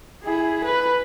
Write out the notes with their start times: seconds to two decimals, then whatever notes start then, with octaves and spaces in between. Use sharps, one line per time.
0.23 E4 G#4
0.65 B4